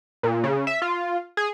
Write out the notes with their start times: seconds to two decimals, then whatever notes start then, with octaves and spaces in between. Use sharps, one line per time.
0.23 A#2
0.44 C#3
0.67 E5
0.82 F4
1.37 G#4